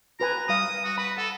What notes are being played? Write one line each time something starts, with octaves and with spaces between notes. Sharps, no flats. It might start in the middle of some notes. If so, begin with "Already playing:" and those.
F#4 B4 G#5 A#5
G3 F5 D#6
F#4
B4 B5
A4 F#5